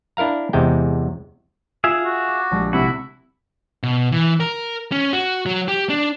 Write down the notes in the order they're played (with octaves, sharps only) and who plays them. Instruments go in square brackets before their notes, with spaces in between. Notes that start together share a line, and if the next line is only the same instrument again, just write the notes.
[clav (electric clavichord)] D4 E4 A#4 F5 A#5
E2 C3 G#3 G5
[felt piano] F4 [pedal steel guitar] G#4 E5 F5
[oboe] F#4
[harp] D6
A#1 G#3 G4
[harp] C2 A3 [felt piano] C3 [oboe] E4 [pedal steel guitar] F#4
[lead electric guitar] B2
E3
A#4
C#4
F#4
F#3
G4
D4